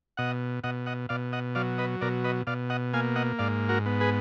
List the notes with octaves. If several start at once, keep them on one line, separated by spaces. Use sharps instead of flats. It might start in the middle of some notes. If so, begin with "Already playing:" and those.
B2 D#5 F#5
B2 D#5 F#5
D#5 F#5
B2 D5 F5
D#5 F#5
F#3 D5 F5
B4 D#5
B2 A#4 D5
B4 D#5
B2 D5 F5
D#5 F#5
A#3 F5 G#5
D#5 F#5
G#2 D5 F5
F#4 A#4
B3
G#4 B4